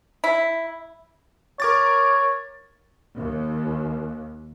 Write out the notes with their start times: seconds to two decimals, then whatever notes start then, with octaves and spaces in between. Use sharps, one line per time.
0.24 E4
1.60 A#4 C#5 D6 A6
3.17 D#2